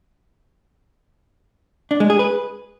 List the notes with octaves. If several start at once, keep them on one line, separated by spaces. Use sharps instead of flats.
D4
G#3
G#4
B4